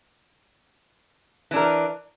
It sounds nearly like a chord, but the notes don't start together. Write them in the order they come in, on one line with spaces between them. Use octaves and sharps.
E3 D4 A#4